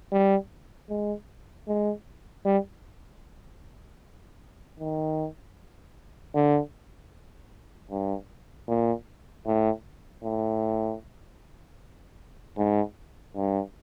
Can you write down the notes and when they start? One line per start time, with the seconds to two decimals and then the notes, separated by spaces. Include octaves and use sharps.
0.12 G3
0.89 G#3
1.68 G#3
2.45 G3
4.80 D#3
6.35 D3
7.91 G2
8.69 A#2
9.46 A2
10.24 A2
12.58 G#2
13.36 G2